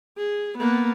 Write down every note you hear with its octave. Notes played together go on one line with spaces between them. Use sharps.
G#4
A#3 B3